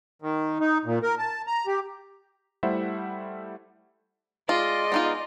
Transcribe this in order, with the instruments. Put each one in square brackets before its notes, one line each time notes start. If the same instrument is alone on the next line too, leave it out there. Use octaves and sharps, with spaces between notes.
[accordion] D#3
D#4
A#2
A#4
A5
A#5
G4
[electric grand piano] G3 A3 E4 C5 E5 F#5
[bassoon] G#3 [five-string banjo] F4 [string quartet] D5 D#5 C6
[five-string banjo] B3 D#4 F4